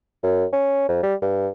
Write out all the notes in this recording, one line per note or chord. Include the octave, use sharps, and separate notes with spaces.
F#2
C#4
F2
G3
G2